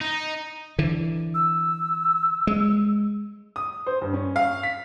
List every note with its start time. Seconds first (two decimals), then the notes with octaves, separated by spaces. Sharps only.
0.01 D#4
0.79 D3 E3
1.35 E6
2.47 G#3
3.56 D#6
3.86 C5
4.01 G2
4.14 C#4
4.36 F5
4.63 B6